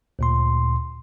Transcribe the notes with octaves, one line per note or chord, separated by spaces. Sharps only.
D2 A#2 C6